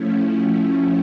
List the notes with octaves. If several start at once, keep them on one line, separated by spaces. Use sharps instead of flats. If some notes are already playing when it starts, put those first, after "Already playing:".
Already playing: F3 A3 C#4 E4